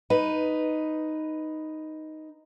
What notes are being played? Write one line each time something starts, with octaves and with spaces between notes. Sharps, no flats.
D#4 B4